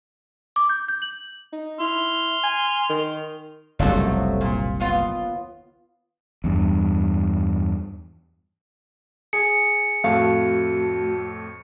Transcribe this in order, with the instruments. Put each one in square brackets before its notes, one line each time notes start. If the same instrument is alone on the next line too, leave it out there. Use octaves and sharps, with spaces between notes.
[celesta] D6
G6
G6
F#7
[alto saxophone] D#4
[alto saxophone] E4 [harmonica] C6 F6
[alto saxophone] G#5
D#3
[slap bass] F#1 C2 [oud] F3 F#3 A3
[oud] A#2
D#2 B3 F4
[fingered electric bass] E2 G2
[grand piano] G#4 [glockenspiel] C#7
[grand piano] F2 A2 [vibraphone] A3 F#4 [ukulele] F5